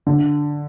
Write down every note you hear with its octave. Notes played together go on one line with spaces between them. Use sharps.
D3